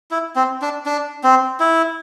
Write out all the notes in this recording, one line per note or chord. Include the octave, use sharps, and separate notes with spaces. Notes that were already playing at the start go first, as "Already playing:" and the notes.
E4
C4
D4
D4
C4
E4